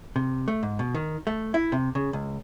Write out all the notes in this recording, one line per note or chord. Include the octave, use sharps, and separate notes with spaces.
C3
A3
G#2
B2
D#3
A3
E4
C3
C#3
C#2